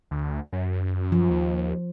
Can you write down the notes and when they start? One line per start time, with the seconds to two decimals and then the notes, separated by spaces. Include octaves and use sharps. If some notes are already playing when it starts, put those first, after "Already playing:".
0.11 D2
0.52 F#2
1.12 F3
1.30 D#2